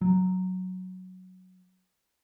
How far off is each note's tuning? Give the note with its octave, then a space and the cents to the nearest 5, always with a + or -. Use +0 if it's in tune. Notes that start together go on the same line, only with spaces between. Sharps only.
F#3 +0